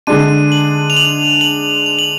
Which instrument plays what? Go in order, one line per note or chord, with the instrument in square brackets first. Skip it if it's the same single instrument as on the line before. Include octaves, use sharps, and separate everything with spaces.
[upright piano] D3 G#3 D4 [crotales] D#7
[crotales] F#7
F7
F#7
F#7
F7
F#7